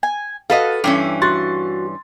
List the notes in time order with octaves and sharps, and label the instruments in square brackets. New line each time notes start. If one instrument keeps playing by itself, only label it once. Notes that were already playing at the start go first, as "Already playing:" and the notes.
[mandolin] G#5
[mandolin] F#4 [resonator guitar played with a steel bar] A4 B4 D#5 [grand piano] F5 F6
[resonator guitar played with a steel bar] G2 E3 C#4 [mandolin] G5 G#5 E6 [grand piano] D6
[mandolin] F#4 [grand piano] C6 A6